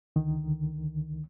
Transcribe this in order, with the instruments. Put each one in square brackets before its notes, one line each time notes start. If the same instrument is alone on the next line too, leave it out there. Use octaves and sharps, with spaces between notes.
[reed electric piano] C#2 D3 D#3